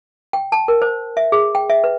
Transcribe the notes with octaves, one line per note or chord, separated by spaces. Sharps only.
G5
A5
A#4
C5
E5
G#4
G5
E5
B4